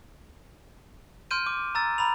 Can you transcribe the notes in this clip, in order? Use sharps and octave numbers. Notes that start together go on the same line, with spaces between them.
C6 F6 G6 D7 D#7
D6
A#5 E6 A6
A#5 B5 F7